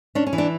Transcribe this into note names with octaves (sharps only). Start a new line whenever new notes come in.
C#4 D4
C#4
E3
D4